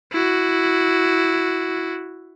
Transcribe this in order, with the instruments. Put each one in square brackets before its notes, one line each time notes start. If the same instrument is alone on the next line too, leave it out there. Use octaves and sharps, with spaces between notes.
[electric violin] E4 F#4